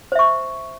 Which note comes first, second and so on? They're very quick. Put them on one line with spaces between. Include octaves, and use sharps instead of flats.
C5 E5 C#6